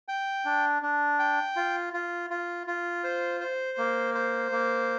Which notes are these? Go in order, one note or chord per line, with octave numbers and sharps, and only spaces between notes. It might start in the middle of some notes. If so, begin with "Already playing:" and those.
G5
D4
D4
G5
F4
F4
F4
F4
C5
C5
A#3
C5
A#3